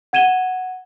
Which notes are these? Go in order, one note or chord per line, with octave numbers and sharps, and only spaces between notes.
F#5 G#6 D#7 E7 G7